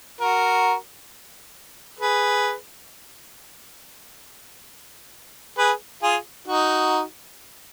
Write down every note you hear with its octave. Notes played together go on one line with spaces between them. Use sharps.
F#4 A#4
G#4 B4
G#4 B4
F4 G#4
D#4 F#4